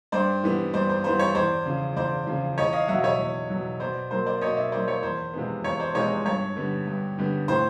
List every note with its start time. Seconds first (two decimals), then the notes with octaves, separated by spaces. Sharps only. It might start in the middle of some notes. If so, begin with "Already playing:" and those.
0.12 G2 C5 D5
0.43 E3 G3 B3
0.74 G2 C5 D5
0.89 C5
1.04 E3 G3 B3 C5
1.19 C#5
1.35 E2 C5 D5
1.66 C#3 F3
1.96 E2 C5 D5
2.27 C#3 F3
2.58 E2 C#5 D#5
2.73 D#5 F5
2.88 B2 F#3 E5 F#5
3.04 C#5 D#5
3.19 E2
3.50 B2 F#3
3.80 B2 C5 D5
4.11 F#3 A#3 C5
4.26 C5 D5
4.41 B2 C#5 D#5
4.57 D5 E5
4.72 F#3 A#3 C5 D5
4.88 C#5
5.03 E2 C5
5.34 C3 F3 G#3 B3
5.64 E2 C#5
5.80 C5 D5
5.95 C3 F3 G#3 B3 C#5 D#5
6.25 G2 C#5
6.56 D3 G3 B3
6.87 G2
7.18 D3 G3 B3
7.48 A2 C5